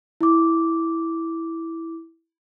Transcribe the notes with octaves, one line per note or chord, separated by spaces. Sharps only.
E4 D6